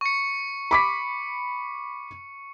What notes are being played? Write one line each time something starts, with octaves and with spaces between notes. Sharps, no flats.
C#6 C#7
B5 D6 B6